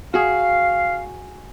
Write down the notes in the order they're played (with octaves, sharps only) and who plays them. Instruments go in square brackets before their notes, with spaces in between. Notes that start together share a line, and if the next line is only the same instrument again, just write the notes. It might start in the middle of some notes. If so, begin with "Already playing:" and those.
[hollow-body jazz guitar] F#4 G#4 [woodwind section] F5